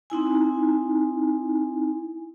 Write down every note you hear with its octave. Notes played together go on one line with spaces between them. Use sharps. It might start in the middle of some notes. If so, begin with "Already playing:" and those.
C4 D#4 E4 G#5